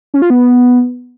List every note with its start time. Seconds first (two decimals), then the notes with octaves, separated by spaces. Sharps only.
0.14 C#4
0.22 F4
0.30 B3